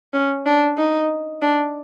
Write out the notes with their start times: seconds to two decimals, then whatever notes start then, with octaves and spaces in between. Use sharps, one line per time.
0.14 C#4
0.46 D4
0.77 D#4
1.42 D4